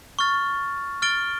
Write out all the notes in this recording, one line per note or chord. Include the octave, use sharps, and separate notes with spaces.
C#6 F6 A6
F6 A6 D7 G7